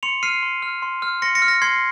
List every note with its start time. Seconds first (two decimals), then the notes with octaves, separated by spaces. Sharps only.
0.03 C6 C#7 F7
0.23 F6 C7 D#7
0.42 C6
0.63 F6
0.82 C6
1.02 F6
1.22 C6 A#6 C#7
1.35 A#6 C#7
1.42 F6
1.48 A#6
1.62 C6 G#6 C7